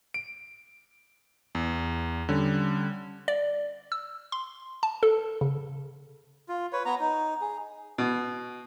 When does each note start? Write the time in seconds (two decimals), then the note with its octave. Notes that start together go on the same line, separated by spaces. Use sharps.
0.14 D7
1.55 E2
2.29 D3 G3 C#4
3.28 D5
3.92 E6
4.32 C6
4.83 A5
5.03 A4
5.41 C#3
6.48 F4
6.73 B4 C#5
6.85 B3 A#5
7.00 D#4
7.41 G#4
7.98 B2